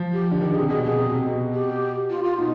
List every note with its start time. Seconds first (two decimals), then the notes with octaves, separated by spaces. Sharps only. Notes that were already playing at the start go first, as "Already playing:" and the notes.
Already playing: F3
0.13 G4
0.31 D3
0.41 D#3 G4
0.50 D3 G#4
0.60 C3
0.69 B2 G#4
0.83 B2 G#4
0.97 C3
1.12 C3
1.26 B2
1.53 G4
2.10 F4
2.24 F4
2.38 B2 D#4